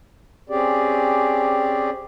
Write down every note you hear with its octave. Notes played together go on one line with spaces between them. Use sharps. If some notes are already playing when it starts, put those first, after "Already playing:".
C4 C#4 G4 G#4 D5